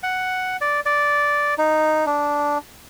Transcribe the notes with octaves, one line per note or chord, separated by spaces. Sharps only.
F#5
D5
D5
D#4
D4